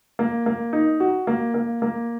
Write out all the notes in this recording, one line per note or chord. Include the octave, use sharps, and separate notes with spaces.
A#3
A#3
D#4
F#4
A#3
A#3
A#3